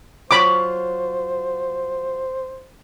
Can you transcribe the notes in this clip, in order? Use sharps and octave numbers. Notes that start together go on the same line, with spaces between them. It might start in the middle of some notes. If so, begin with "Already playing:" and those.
F#3 F4 C5 C#5 B5 D6